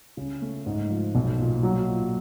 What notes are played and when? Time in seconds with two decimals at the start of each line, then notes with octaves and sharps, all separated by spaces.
0.17 C#3
0.42 A3
0.66 G#2
0.90 F3
1.15 B1
1.40 A#2
1.63 F#3
1.88 A#2